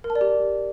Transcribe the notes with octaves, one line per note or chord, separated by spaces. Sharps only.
A#4
A5
D5
G4